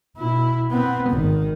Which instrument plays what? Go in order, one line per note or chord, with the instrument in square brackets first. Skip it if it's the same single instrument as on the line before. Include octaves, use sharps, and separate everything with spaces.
[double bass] B2 E4
B3 C4
G#1 D#3